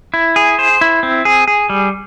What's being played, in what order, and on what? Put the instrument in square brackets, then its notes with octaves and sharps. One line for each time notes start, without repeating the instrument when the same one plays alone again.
[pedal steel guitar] E4
G#4
C5
E4
C4
G#4
G#4
G3